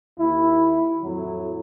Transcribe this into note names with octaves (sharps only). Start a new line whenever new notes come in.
D#2 E4
F2 A2 F#3